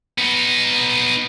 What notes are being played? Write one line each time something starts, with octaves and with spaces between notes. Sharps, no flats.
B3 D#4